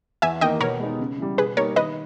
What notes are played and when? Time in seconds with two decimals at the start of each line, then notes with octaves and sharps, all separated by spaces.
0.22 E2 E5 G#5
0.41 D#3 A#3 D#4 D#5 G5
0.60 B2 A#4 C#5
0.79 G#3 B3 D#4
1.00 C#3
1.18 E3 G3
1.38 B2 G#4 B4
1.57 G3 A#3 D#4 A#4 C#5
1.76 D#3 B4 D#5